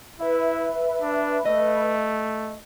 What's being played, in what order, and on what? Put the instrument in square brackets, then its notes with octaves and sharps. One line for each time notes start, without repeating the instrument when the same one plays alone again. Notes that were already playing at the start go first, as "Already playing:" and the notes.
[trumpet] E4 [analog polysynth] B4 E5
[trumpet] D4
[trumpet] A3 [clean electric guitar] D#5